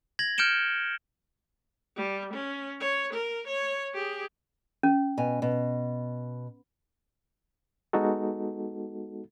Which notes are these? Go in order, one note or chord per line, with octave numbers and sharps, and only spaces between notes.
G#6 A#6 F#7
F6 G6 C#7 D7 E7 G7
G3
C#4
C#5
A#4
C#5
G4 G#4
C#4
B2 G#5
B2
G#3 B3 D#4 F#4 A4